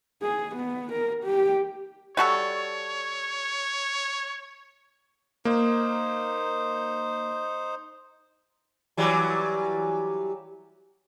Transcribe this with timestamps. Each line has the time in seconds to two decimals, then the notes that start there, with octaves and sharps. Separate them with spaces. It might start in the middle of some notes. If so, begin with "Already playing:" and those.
0.22 G#4
0.56 B3
0.92 A#4
1.24 G4
2.17 G3 F#4 A4 C#5
5.45 A#3 D#4 C5
8.97 E3 F#3 G3